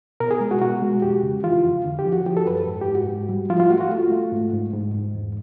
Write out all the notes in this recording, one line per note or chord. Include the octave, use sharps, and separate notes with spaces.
B2 A#4
G#4
G#3
F#4
B2 F#4
G#3
F2 G4
C#3
E3 F4
F2
D3
G4
F3
F#4
F3 G4
A4
F#2 B4
G#2
G4
G#2
F#4
G#2
G3
F3 F4
F4
A3 F#4
F#4
A3 F4
A3
G#2
G#2
G#2
G#2
E2